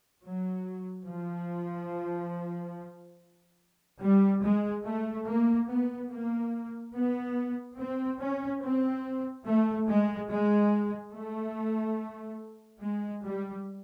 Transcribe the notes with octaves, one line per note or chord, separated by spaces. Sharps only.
F#3
F3
G3
G#3
A3
A#3
B3
A#3
B3
C4
C#4
C4
A3
G#3
G#3
A3
G#3
G3